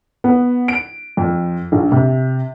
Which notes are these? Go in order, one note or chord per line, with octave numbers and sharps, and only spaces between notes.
B3
D7
F2
A#1
C3